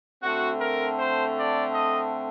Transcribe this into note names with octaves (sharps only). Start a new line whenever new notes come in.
D3 A3 C4 F#4
A#4
C5
D5
D#5